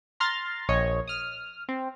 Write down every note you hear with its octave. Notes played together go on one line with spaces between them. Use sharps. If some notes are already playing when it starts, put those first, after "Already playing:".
A#5 C6 F6 A6
A#1 C#5 D#5
D#6 F6
C4